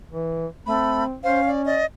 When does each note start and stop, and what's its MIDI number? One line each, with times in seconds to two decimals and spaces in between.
0.10 0.47 52
0.66 1.04 57
0.66 1.15 60
0.66 1.05 83
1.24 1.82 61
1.24 1.41 72
1.24 1.50 77
1.47 1.64 74
1.66 1.84 74
1.66 1.85 75